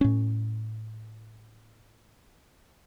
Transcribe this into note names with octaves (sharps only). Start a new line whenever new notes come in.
A2 C#4